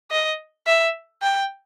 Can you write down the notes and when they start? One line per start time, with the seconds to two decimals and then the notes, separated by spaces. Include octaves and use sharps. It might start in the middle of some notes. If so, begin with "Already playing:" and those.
0.11 D#5
0.67 E5
1.22 G5